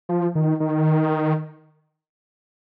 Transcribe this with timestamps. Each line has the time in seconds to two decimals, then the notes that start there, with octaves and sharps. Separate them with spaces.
0.09 F3
0.35 D#3
0.60 D#3